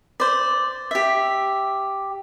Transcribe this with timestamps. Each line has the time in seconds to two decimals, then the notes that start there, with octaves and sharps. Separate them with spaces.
0.20 C5 D5
0.91 G4 E5